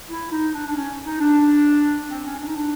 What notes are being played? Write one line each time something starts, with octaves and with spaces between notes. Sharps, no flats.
E4
D#4
D4
D4
C#4
D#4
D4
C4
C#4
D4
D#4
D4